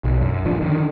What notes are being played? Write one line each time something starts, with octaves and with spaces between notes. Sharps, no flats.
B1
F#2
D1 G1 D3 F3
D3 D#3